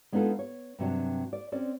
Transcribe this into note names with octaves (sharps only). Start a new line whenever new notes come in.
G#3 B3 D4 D#4 F4 A4
C#5
G2 C3 F#3 D4
D5
C4 C#4 D5